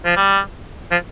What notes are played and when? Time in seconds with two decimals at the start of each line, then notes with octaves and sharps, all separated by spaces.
0.05 F3
0.16 G3
0.91 F3